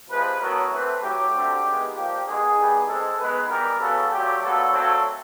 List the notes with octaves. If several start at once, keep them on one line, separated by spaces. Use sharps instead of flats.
C3 F3 G#3 B4
A2 F#3 B3 A#4
E3 A3 C4 B4
A2 F#3 A3 G4
D3 F#3 A3 C4
D#3 G#3 B3
A#2 F3 A#3 G4
D#3 G#3 B3 G#4
D#3 G3 B3
E3 G#3 C4 A4
D#3 G#3 B3 B4
E3 G3 B3 A#4
C#3 F#3 B3 A4
A#2 F#3 A3 G4
A#2 F#3 B3 A4
A#2 F#3 A3 C4 A4